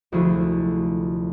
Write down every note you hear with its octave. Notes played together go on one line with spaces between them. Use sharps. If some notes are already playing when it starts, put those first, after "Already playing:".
F1 D2 F3 E4 F#4 G#4